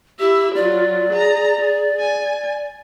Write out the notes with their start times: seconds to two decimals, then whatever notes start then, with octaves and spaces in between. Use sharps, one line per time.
0.19 E4 G4 E5
0.55 F#3 F4 D5
1.10 G#4 A#5
1.59 G#4
1.99 G#5